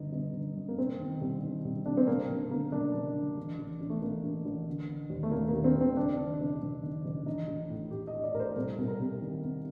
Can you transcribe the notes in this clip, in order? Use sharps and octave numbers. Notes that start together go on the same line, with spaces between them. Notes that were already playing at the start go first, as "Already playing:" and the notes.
Already playing: G1 F#2 D#4
G1
G1
F#2
A#3
C3 C4
D#3
C2
D#3
C2
C2 D4
C4
F#1 A#3
F#1
D3 A#3
F#1 D4
F#1
D3
A1
A1
A1
A3
A1 A#3
A1
A1
D3
D3
D#2
A3
D#2 A#3
A#3
D#2
C4
D#2
C4
F#1 D4
D#3
F#1
F#1
D#3
F#1
A1 D#4
A1
A2
A2 G4
D#5
A2
D5
A2 A#4
C5
C2 A#4
C2
A#4
C3
D#3
C3